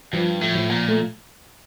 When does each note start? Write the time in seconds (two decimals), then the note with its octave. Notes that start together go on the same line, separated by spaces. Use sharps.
0.13 G2 F3
0.41 A2
0.55 F3
0.70 A#2
0.88 A3